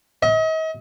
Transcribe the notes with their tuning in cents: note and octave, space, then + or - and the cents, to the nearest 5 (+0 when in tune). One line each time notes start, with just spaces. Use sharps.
D#5 +40